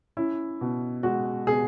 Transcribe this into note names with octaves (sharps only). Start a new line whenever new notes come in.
C#4 E4
B2
G#3 F#4
B2 G#4